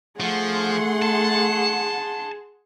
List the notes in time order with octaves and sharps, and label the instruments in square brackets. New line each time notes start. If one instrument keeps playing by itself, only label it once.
[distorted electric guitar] F3 [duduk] A3 [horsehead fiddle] G#4 [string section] F#5 C6
[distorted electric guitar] A5